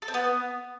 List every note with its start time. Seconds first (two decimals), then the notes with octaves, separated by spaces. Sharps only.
0.02 A4
0.08 C4
0.14 B3